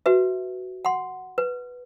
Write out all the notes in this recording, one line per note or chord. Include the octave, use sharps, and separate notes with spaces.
F#4 B4 E5
F#5 C6
B4